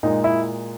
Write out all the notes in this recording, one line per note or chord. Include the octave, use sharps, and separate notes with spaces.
A#2 G#3 D#4
E4